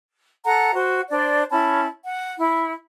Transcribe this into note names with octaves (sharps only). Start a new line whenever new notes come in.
A4 F#5 A#5
F#4 C5
D4 C5 D5
C#4 E4 A5 B5
F#5
E4